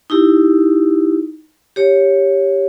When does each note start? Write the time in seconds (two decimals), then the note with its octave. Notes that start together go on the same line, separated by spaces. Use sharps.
0.10 D#4 E4 G4
1.76 G4 C#5